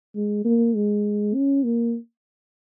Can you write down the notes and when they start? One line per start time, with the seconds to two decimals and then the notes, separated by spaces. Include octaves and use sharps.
0.15 G#3
0.45 A#3
0.75 G#3
1.35 C#4
1.65 A#3